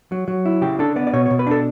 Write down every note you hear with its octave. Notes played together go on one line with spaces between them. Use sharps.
F#3
F#3
E4
C#3 G4
D4 A4
B3 D5
D5
B2 C#5
B2 C#5
B4
D4 A4